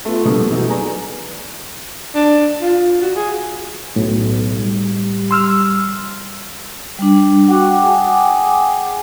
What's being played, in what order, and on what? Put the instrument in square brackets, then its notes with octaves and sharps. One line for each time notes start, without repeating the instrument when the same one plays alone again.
[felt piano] A3 B3 F4
A#1 B2 G3 A#3 A4
E3 F#3 A3 D#4
G#4 B4 D5 G#5 A#5
[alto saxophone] D4
F4
F#4
G#4
[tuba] B1 [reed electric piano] A2
[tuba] G3
[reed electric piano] C6 E6 F6
[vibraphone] G3 D4
[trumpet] F#4 [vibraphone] F#5 G5 D6
[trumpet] G#4